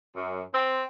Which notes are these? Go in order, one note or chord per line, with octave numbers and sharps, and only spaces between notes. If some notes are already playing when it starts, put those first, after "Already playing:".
F#2
C4